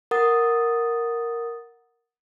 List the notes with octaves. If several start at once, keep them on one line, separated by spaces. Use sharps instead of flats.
A#4 F#5 D#6 A6